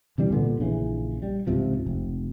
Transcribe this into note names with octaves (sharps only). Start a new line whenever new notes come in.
C3 E3 G3 D4
A#2 D3 B3
A#1 C#3 E3
G3
C#2 G#2 C3 F3
F1